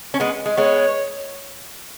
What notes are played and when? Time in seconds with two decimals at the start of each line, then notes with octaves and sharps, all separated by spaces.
0.14 C#4
0.20 G#3 B3
0.46 G#3
0.57 G#3 B3 C#5